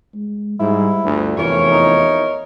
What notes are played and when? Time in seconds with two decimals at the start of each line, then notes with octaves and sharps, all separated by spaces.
0.14 G#3
0.60 G#2 G3 E4
1.04 G1 D2
1.38 F1 E2 E3 E4 A#4 C#5
1.71 D#4